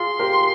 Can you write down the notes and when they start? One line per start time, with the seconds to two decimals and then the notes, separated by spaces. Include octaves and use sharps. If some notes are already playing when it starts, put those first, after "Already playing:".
Already playing: F4 G#4 C6
0.19 G4 A#4